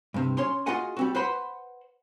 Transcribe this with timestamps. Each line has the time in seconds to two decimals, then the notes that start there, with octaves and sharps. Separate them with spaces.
0.14 G2 C3
0.38 C#4 C#5 C6
0.66 F4 F#4 G#4 D#5 F#5 G#5
0.97 G3 C4 F#4
1.15 B4 C5 F#5 B5 C6